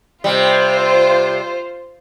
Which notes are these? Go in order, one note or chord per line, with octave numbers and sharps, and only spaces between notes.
C3 G3 F4 C5